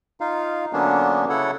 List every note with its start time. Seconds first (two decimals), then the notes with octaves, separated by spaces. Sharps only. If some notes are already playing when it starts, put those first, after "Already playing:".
0.21 D#4 F4 F5
0.73 D3 F#3 A#3 B3 C#4 D4
1.29 C#3 E4 A4 C#5 F#5